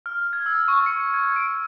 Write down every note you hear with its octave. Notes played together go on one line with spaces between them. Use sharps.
F6
G#6
E6
C#6
C#7
G#6
D7